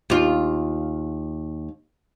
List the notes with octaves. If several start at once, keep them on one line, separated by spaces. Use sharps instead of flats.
D#2 F4